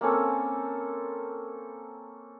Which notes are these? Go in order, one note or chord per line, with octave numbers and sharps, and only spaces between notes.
A#3 C4 C#4 A4